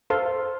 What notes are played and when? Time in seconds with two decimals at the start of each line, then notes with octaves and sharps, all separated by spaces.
0.10 A4 C5 F5 C6